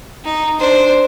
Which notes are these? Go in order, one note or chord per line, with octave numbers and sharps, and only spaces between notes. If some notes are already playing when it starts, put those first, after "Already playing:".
D#4
D4 C5